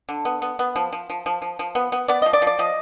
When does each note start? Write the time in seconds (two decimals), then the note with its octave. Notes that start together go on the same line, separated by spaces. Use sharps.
0.09 D3
0.25 B3
0.42 B3
0.59 B3
0.76 F3
0.92 F3
1.10 F3
1.26 F3
1.42 F3
1.59 F3
1.75 B3
1.92 B3
2.08 B3 D5
2.22 F3 D#5
2.33 D5
2.42 F3
2.47 D5
2.59 F3 D#5